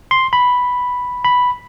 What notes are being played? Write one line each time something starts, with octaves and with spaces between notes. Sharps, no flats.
C6
B5
B5